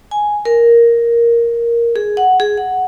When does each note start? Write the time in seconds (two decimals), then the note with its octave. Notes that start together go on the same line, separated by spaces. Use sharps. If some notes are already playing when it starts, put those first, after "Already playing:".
0.11 G#5
0.45 A#4
1.96 G#4
2.17 F#5
2.40 G#4
2.57 F#5